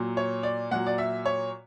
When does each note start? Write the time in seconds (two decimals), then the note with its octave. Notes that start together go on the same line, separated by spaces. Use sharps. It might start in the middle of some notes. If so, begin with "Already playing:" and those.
Already playing: A#2 F#3
0.17 C#5
0.43 D5
0.71 A#2 F#3 F#5
0.87 D5
0.98 E5
1.26 C#5